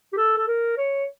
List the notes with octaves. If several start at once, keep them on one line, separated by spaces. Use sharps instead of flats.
G4
A4
A4
A#4
C#5